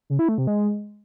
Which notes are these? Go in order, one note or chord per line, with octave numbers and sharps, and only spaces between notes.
C#3
E4
A3
C3
G#3